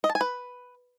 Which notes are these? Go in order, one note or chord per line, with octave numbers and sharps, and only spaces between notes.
D#5
A5
G#5
B4